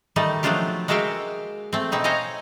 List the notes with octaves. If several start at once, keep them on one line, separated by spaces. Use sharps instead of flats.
D#3 G3 A3 D#4
F3 F#3 A3 D4 F4 G4
G#3 A#3 F#4 E5 F5 G5
A3 C4
B2 C4 D#4 E4
C5 C#5 D#5 F5 G#5 A#5